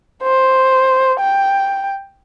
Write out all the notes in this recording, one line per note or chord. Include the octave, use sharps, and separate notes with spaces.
C5
G5